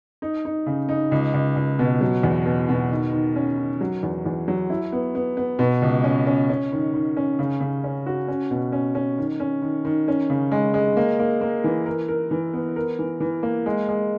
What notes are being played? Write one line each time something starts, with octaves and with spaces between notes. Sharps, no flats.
D#4
D#4
C#3
D#4
C#2
C#2
C#2
B2
F#3
E2
B2
B2
D#3
D#3
C#4
D#3
F#3
E2
E2
F#3
E4
B3
B3
B3
B2
C#2
C#4
C#4
C#4
D#3
D#3
C#4
C#3
C#3
C#4
F#4
C#4
B2
C#4
C#4
D#3
C#4
D#3
D#3
C#4
C#3
G#3
G#3
A#3
A#3
A#3
E3
A#4
A#4
E3
B3
A#4
E3
E3
A#3
G#3
G#3